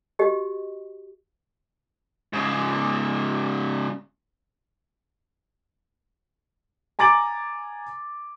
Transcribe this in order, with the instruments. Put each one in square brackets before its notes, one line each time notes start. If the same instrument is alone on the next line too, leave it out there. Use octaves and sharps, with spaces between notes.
[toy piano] F#4 G4 D#5
[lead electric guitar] G#2 C#3
[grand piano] G#5 A#5 D6 A6 D7 F#7